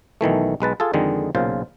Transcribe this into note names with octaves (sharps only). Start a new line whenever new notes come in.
B1 D#3 E3 A3
B1 G#3 B4 A5
F4 G#4 A4
F2 D3 D#3 G#3
B1 A#2 C#3 F4 C5